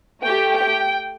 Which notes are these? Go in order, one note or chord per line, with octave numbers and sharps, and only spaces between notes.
A3 G4 G5
G5